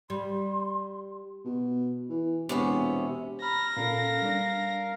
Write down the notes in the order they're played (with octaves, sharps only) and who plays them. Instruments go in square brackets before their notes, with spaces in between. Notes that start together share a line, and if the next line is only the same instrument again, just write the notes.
[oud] G3 [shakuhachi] C6
[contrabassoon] B2
E3
[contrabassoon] E1 [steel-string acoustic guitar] C3 B3 C#4
[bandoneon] A#5 B5 F6 [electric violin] A#6
[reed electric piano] A#2 C#4 A4 [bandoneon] A#4 F5
[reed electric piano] G3 D4